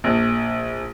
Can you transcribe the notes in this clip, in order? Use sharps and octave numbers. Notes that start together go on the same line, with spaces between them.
A#1